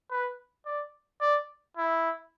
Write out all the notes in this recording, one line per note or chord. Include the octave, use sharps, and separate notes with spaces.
B4
D5
D5
E4